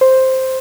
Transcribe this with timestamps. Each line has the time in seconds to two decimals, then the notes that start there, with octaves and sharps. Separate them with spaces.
0.01 C5